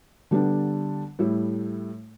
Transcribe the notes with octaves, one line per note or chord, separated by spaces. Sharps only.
D3 G3 B3 D4
A2 G3 E4